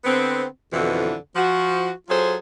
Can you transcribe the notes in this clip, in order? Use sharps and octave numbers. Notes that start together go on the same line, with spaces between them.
D3 B3 C4
F2 B2 D3 E3
F3 F#4
F#3 F4 G#4 A4 C5